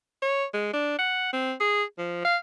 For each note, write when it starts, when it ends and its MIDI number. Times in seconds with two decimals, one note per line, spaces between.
0.22 0.45 73
0.54 0.72 56
0.74 0.96 62
0.99 1.29 78
1.33 1.53 60
1.61 1.84 68
1.98 2.22 53
2.25 2.37 77